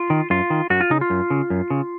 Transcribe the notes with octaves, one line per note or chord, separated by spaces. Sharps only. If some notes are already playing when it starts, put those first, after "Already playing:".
Already playing: F4
D#3
F#2 F4
D#3
F#2 F#4
F4
C#3 D#4
F4
F#2
C#3
F#2
C#3